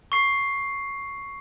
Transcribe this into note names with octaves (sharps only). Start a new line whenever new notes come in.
C#6 C7